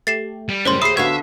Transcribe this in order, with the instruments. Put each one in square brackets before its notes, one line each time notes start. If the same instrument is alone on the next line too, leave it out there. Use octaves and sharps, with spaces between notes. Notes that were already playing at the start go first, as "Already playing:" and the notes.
[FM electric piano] A3 G4 [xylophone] A6 C7 E7
[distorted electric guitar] G3
[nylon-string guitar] F#2 [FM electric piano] A2 C#3 [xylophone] C5 C#5 C6
[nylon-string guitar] D2 G#4 [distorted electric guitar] C5 [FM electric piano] E5 B5 E6 [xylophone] D#6 C7
[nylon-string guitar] D2 D3 F5 [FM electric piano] B3 F#4 C#5 [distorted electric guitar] E5 [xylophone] G#6